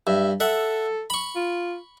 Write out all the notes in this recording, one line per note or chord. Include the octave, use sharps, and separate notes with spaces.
G2 E5
A4 E5 F#5
B5 C#6
F4